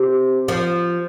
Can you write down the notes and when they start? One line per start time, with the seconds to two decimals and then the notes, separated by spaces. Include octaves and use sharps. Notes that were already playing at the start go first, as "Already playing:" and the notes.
Already playing: C3
0.48 F3